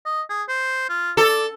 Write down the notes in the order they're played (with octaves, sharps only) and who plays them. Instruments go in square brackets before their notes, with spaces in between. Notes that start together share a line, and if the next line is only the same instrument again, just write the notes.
[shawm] D#5
G#4
C5
F4
[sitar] A4 [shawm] D5